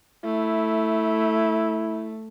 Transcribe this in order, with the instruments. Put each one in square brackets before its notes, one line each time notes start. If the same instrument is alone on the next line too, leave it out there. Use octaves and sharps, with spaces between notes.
[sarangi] A3 [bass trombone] E4